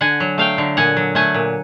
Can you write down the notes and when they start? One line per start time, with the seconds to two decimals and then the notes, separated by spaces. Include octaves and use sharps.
0.01 D3 F#5 G#5
0.20 F#3
0.38 A3 F5 G5
0.58 D3
0.77 A#2 F#5 G#5
0.97 F#3
1.15 A3 F#5 G#5
1.34 A#2